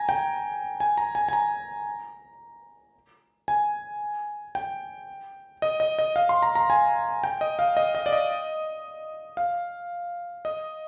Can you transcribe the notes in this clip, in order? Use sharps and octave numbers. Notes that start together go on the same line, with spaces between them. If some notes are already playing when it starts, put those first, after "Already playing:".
Already playing: G#5 A#5
G5
G#5
A#5
G#5
G#5
A#5
G#5
G5
D#5
D#5
D#5
F5
C6
A#5
A#5
G#5
G5
D#5
F5
D#5
D#5
D5
D#5
F5
D#5